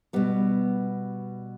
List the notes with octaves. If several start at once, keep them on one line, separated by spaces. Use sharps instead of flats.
B2 G3 B3